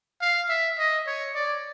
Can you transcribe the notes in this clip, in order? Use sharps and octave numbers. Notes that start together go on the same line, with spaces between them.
F5
E5
D#5
C#5
D5